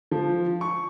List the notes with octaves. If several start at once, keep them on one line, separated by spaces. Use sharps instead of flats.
F3
C#6